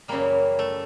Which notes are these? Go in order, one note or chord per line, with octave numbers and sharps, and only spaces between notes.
F#2 C#3 E3 G3 A#3
A3